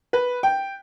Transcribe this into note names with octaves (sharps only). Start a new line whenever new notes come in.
B4
G5